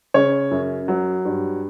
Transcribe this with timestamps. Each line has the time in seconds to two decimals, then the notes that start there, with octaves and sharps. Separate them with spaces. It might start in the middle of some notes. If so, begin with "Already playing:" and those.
0.14 C#3 C#5
0.51 F#2
0.88 F#3
1.25 G2